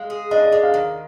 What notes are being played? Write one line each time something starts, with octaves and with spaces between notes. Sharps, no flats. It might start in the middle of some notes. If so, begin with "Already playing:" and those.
Already playing: G#3 F5
G#4
D4 D#5
D5
G#3 D5
F5
D#3